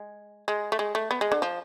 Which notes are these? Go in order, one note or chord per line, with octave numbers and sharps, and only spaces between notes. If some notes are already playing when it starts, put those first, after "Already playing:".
Already playing: G#3
G#3
A3
G#3
A3
B3
G#3
D3
F3